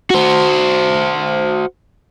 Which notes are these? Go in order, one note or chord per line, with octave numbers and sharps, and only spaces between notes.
F#4 C5